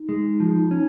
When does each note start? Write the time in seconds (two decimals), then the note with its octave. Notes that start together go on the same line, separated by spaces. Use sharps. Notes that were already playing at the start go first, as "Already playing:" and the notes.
Already playing: D#4
0.09 G#3
0.40 F3
0.71 C#4